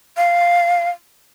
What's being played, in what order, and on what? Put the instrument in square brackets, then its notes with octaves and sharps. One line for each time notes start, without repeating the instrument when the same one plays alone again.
[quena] F5